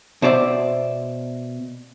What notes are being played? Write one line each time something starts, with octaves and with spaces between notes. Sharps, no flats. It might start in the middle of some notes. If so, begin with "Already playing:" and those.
B2 C5 D5 E5